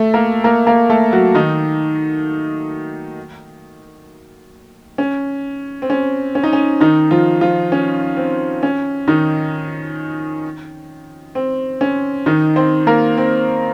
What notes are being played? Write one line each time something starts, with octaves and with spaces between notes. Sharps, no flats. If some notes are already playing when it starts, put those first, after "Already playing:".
Already playing: A3 A4
A#3 A#4
A#3 A#4
A#3 A#4
A3 A4
F#3 F#4
D#3 D#4
C#4
C4
C#4
C#4
D#4
C#4
D#3 D#4
F3 F4
F3 F4
C#4
C4
C#4
D#3 D#4
C4
C#4
D#3 D#4
C4 C5
A#3 A#4
C4